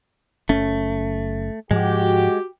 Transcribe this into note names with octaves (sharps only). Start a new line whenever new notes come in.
F#1 A3 C#4
G#2 F3 G#3 F#4 G4